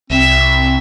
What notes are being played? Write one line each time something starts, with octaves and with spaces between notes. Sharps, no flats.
C2 C4 E5